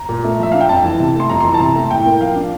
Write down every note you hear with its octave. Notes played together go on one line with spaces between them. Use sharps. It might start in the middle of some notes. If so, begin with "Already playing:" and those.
Already playing: A#5
A#2
A3
F3 E5
D4 F5
G5
F2 A5
E3
C3
A3 C6
F2 A#5
C6
E3 A#5
A5
C3 A#5
A3
A2 G5
A#3
F3 F5
D4